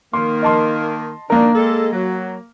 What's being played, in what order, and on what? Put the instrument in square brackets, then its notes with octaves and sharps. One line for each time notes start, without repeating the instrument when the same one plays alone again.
[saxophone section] D#3 A#3 [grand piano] C6
[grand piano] D#5 A5 C6
[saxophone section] D#3 D4 [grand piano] A#3 A#4
[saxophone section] G#3 A4
F#3